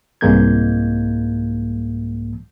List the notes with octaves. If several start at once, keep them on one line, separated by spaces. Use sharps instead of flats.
C2 G#2 G#3 A#3 G6 G#6